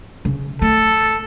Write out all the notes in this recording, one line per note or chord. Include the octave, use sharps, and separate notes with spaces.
C#3
A3 A4